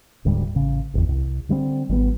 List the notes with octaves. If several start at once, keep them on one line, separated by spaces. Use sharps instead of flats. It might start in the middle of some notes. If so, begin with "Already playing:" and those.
D1 D2 G#2 G3
A1 C#3
D1 G1 E2
C2
D3 G3 G#3 C4
G#1 G3 B3